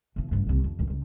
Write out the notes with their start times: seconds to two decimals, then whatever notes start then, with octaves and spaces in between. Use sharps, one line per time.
0.16 B1 E3
0.31 A1 G2
0.47 C2 D3
0.64 F2
0.79 C#2 A#2
0.90 C#2